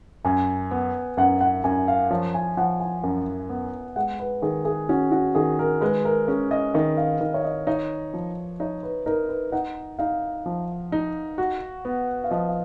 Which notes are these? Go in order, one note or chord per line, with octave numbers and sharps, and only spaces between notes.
F#2 G#5
B3
F#2 F#5
F#5
F#2 G#5
F5
F3 C#5
G#5
F3 F#5
G#5
F#2
B3
G#3 F#5
B4
D#3 G#4
G#4
C#4 F#4
F#4
D#3 G#4
A#4
G#3 B4
A#4
C#4 G#4
D#5
D#3 D#5
F5
D#3
C#5
D#5
D#4 C#5
F3
D#4 C#5
B4
D#4 A#4
B4
D#4 F#5
D#4 F5
F3
D#4
F#4
B3
F5
F3 D#5
F5